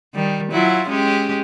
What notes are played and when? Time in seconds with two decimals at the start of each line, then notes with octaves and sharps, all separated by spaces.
0.14 D#3 G3
0.52 F#3 E4 F4
0.88 G#3 C#4 G4